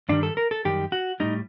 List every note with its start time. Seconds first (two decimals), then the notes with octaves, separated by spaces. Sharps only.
0.09 G2 D#3 G3 D4
0.23 A4
0.37 A#4
0.51 A4
0.65 F#2 D#3 G3 G4
0.92 F#4
1.20 A2 G3 D#4